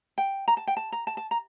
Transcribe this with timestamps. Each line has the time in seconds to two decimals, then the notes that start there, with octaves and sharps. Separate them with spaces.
0.18 G5
0.48 A#5
0.57 A5
0.67 G5
0.77 A5
0.92 A#5
1.07 A5
1.17 A5
1.31 A#5